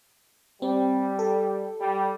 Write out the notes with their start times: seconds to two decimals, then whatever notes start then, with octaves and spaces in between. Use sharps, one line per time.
0.62 G3 C4
1.19 A4
1.81 G3